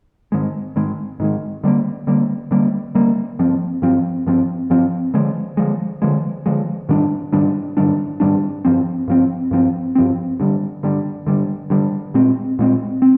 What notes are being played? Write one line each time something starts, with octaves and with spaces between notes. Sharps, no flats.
G#2 D#3 G#3
G#2 D#3 G#3
G#2 D#3 G#3
D3 G3 A#3
D3 G3 A#3
D3 G3 A#3
D3 G3 A#3
G2 F3 C4
G2 F3 C4
G2 F3 C4
G2 F3 C4
D3 F3 G#3
D3 F3 G#3
D3 F3 G#3
D3 F3 G#3
G#2 D#3 G3 D4
G#2 D#3 G3 D4
G#2 D#3 G3 D4
G#2 D#3 G3 D4
G2 F3 C4
G2 F3 C4
G2 F3 C4
G2 F3 C4
G2 D3 G3
G2 D3 G3
G2 D3 G3
G2 D3 G3
A#2 G#3 C4
A#2 G#3 C4
C4